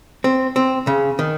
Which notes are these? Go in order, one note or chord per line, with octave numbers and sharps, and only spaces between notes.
C4
C4
C#3
D#3